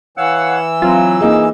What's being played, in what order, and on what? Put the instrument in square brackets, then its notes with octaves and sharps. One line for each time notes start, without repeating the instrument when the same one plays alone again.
[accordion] E3 E6 [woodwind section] C#5 F5 F#5
[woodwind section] F#3 [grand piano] C4 [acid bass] F4
[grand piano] A#3 D#4 G#4